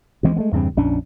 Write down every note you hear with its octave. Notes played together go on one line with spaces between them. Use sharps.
D2 E3 G#3 C4
G#3 A3 B3
E2 G2 C#3 C4
A#1 F2 C#4 D4